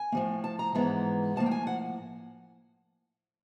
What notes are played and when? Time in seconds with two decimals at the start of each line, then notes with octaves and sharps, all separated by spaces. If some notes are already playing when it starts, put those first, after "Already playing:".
Already playing: G#5
0.12 A2 F3 A#3
0.44 A5
0.59 A#5
0.75 G#2 E3 G#3 B3 A#5
1.36 A2 F3 A#3 A5
1.46 G5
1.51 G#5
1.67 F#5